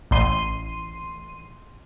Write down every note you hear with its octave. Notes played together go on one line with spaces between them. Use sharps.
A1 C6 D#7